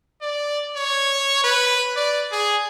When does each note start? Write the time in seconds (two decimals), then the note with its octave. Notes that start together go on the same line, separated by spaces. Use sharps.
0.22 D5
0.76 C#5
1.44 B4
1.96 D5
2.32 G#4